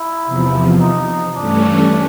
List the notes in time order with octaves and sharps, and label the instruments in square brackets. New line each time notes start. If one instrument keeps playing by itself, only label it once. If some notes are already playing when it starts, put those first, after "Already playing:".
Already playing: [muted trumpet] E4
[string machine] E2 C3 F3
[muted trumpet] D#4
[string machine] G2 E3 A3 C#4 [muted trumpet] D4